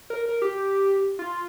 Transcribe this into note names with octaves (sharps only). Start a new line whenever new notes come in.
A#4
A#4
G4
F4